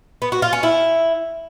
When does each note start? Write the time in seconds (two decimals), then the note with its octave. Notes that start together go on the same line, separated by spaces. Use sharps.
0.22 B3
0.32 F#4
0.42 F4
0.53 C#4
0.63 E4